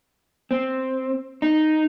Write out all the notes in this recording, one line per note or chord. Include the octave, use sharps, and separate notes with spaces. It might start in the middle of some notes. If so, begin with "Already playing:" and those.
C4
D#4